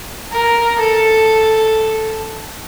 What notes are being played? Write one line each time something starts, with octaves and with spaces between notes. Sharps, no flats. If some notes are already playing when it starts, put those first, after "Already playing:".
A#4
A4